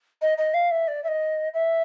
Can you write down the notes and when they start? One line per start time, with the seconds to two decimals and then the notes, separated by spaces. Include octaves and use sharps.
0.22 D#5
0.38 D#5
0.54 F5
0.71 E5
0.87 D5
1.04 E5
1.08 D#5
1.54 E5